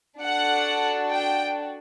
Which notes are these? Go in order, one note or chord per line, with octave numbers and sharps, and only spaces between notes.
D4 F#4 A4 F#5
G5